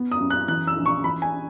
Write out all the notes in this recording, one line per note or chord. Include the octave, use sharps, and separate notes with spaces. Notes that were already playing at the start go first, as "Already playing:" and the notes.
Already playing: B3
D#6
F#2
F#6
E3 F#6
E6
A#1
C#6
E3 B5
G#5